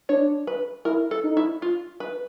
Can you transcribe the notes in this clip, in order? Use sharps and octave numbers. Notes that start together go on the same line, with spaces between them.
D4 C#5
B4
E4 A#4
A4
D#4
E4
F4
B4